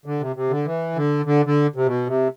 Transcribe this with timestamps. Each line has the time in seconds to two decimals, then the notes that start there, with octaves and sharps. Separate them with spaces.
0.06 D3
0.20 C3
0.36 C3
0.50 D3
0.66 E3
0.96 D3
1.26 D3
1.46 D3
1.76 C3
1.86 B2
2.07 C3